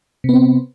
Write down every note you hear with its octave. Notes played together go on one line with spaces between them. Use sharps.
C3 B3 C4